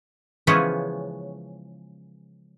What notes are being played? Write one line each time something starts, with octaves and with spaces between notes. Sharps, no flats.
C#3 E3 F3 G#3 B3 C#4